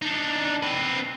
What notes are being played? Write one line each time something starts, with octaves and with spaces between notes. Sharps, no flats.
D4 D#4
C4 B4